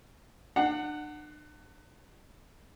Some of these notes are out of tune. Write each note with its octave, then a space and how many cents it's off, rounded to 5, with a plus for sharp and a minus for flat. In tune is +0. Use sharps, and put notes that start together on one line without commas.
D4 +40 F#5 +0